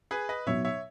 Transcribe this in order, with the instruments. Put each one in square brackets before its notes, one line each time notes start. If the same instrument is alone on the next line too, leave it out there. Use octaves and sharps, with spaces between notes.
[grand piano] G#4 B4
B4 D#5
[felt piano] B2 F#3 B3 D#4 [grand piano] C#5 E5
[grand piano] C#5 E5